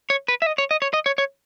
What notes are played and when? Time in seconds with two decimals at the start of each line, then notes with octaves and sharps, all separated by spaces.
0.10 C#5
0.28 B4
0.42 E5
0.46 D#5
0.58 C#5
0.71 D#5
0.82 C#5
0.93 D#5
1.06 C#5
1.18 C#5